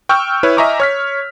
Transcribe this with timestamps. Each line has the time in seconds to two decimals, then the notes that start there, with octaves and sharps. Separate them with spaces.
0.09 G5 C#6 E6 F6 G6
0.43 E4 B4 C#5
0.57 D#5 E5 G#5 A#5 C#6 D6
0.80 C#5 F6 B6